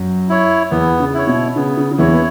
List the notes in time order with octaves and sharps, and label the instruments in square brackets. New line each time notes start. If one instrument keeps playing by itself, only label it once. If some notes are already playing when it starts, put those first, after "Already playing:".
Already playing: [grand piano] F#2 F#3
[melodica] E4 C#5
[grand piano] E2 E3 [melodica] B3
[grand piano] C#3
[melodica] E4 C#5
[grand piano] B2
[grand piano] C#3 [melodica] B3
[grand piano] C#3
C#3
[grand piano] E2 E3 [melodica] E4 C#5
[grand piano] B3